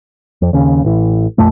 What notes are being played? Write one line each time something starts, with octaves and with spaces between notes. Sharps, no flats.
F2
D#2 C#3
A1 E3
A#1 F2 A#2 A3